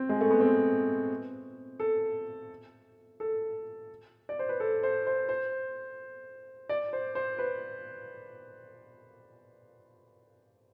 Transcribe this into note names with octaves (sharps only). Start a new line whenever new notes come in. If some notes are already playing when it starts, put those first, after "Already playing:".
Already playing: C4
G#3
A3
B3
C4
A4
A4
D5
C5
B4
A4
C5
C5
C5
D5
C5
C5
B4